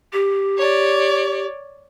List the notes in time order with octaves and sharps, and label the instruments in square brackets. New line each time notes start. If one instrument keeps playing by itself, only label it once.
[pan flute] G4
[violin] C#5 D5